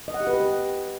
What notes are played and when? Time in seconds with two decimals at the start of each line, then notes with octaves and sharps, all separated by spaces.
0.08 D#5
0.14 F#5
0.21 G4
0.27 B4
0.33 G4